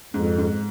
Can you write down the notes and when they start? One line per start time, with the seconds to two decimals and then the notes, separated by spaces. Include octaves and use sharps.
0.14 F2 G#2
0.38 G#2